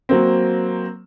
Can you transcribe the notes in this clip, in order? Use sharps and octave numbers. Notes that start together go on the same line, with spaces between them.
F#3 A#3 C4